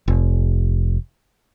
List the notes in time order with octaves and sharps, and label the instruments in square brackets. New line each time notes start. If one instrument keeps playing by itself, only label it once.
[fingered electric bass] F1